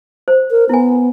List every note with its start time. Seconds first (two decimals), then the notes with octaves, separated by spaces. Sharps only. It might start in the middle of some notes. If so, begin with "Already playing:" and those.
0.28 C5
0.51 A#4
0.69 B3 E4 G#5